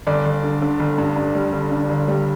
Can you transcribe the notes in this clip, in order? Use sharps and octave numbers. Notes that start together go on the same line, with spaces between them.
G1 D5
G1
D3
D3
G1
G2
G2
G3
D3
D3
G1
G3